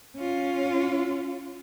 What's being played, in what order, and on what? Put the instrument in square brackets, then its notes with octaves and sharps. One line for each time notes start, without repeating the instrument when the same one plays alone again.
[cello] C#4 F4